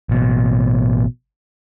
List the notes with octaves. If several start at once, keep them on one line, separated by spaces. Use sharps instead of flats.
A1 B2